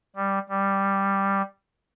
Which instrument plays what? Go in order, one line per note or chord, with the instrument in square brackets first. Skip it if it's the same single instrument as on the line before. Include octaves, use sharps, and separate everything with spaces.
[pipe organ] G3
G3